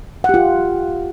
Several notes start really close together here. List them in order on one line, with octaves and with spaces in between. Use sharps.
F#5 G4 F4